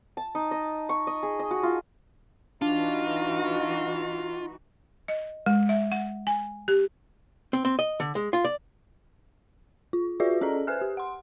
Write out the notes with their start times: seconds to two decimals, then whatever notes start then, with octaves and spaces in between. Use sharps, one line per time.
0.17 A5
0.35 D#4
0.51 D#5
0.89 C#6
1.07 D#5
1.23 G#4
1.39 D#5
1.51 F#4
1.63 F4
2.62 E3 D4 D#4 F4 F#4
5.08 D#5
5.46 G#3
5.69 E5
5.92 F#5
6.27 G#5
6.68 G4
7.53 C4
7.65 C4
7.79 D#5
8.00 D3
8.15 G#3
8.33 F4
8.45 D5
9.93 F4
10.20 F4 F#4 G#4 B4 D5 E5
10.41 C#4 G#4 A4 D5 D#5 A#5
10.67 B4 C5 E5 G#5 F6 F#6
10.81 G4
10.97 F#5 C6